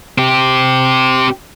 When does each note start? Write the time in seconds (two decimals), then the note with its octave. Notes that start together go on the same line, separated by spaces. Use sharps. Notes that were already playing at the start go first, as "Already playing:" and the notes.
0.18 C4 G4